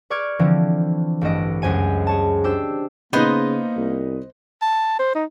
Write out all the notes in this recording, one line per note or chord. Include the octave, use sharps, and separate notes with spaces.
B4 D5 C#6 D6 F6 G#6
D3 E3 F3 C4
A1 G2 A4 B4 D#5 D7
C#2 F#2 C5 G#5 D#7
G#4 C#5 A5
D4 G4 C5 E6
C#3 A#3 B3 D#4 C5 D#5 C6
C2
A5
C5
D#4